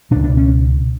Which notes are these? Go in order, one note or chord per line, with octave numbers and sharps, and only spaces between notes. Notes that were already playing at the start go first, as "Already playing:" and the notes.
C#2 B2 D4
D4
C#4